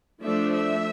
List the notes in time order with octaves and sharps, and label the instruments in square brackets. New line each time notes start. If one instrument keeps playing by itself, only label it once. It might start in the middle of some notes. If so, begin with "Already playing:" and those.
[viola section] F3 A3 D4 E5
E5